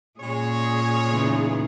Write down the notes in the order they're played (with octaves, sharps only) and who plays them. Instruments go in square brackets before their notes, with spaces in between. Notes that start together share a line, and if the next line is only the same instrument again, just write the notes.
[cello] A#2 G#4 [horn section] G#3 C#4 C#5
[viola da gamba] E2 C#3 D#4